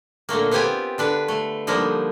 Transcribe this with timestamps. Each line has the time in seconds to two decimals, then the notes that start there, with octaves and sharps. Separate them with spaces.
0.29 A#2 D3 A3 A#3
0.51 B3 C4 F4 G4 G#5
0.98 D3 D4 B4
1.28 A3
1.67 D3 F3 G3 A#3 D#4